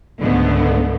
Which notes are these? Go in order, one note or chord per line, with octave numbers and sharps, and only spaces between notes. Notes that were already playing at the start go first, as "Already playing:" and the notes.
C#2 G#2 D3 A3 B3